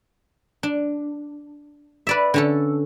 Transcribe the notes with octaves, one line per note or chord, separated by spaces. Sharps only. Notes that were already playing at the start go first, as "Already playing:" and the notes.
D4
B4 D5 E5
D3 C#4 A4